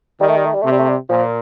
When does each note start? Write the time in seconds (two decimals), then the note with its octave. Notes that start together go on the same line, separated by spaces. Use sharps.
0.20 D#3 G3
0.29 A3
0.36 G3
0.45 A3
0.54 G3
0.62 C3 A3
0.72 G3
0.79 A3
0.89 G3
1.09 A#2 F3